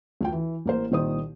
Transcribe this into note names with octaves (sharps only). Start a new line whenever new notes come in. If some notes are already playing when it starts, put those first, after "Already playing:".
D2 F4 G5
E3
A1 A#3 C5
C2 A#2 D#3 C5 D#6